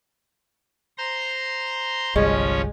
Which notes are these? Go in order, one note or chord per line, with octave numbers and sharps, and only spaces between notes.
C5 A#5 C6
G1 C2 F3 G3 G#3 C#4 C#5